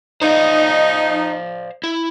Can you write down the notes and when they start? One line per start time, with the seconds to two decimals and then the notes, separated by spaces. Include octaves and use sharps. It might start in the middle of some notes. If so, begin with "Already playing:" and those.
0.22 D#4 C5 D5 F5
1.84 E4